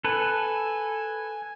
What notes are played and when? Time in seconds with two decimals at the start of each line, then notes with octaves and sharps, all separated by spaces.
0.04 A4 B4 G#5